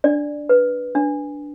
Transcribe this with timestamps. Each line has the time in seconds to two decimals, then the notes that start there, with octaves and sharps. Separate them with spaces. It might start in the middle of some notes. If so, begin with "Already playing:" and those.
0.04 D4 D5
0.49 B4
0.95 D4